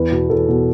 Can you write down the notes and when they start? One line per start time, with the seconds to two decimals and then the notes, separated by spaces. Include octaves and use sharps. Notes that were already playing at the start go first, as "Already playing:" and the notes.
Already playing: E2 B4
0.12 B2
0.30 E2 A4
0.49 B2